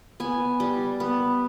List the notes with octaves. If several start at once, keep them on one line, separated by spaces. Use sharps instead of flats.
B3 G#5
G3
B3